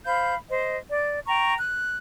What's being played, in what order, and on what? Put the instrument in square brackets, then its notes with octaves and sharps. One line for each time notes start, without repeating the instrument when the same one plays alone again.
[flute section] C5 F5 B5 G6
C5 D#5
D5
G5 A#5 C#6
F#6